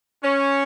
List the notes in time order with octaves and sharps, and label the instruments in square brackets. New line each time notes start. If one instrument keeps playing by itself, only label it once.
[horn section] C#4